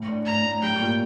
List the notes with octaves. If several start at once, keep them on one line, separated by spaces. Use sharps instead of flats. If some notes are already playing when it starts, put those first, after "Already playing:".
Already playing: A2
D4
A2 A#5
A2
G3 G5
A#2